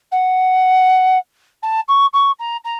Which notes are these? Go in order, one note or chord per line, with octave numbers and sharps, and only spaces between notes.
F#5
A5
C#6
C#6
A#5
A#5